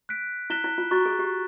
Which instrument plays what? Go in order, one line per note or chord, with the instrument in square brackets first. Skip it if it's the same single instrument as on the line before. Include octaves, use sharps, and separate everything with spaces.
[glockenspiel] F#6 B6 D7
[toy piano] E4 [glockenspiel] F#6 B6 E7 G7
[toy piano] E4
F4
[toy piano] F#4 [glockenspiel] A#5 C#6 F#6 A6
[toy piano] G#4
G4